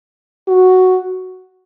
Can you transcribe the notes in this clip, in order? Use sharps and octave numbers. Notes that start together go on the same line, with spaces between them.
F#4